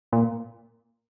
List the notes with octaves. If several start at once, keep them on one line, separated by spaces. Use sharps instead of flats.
A#2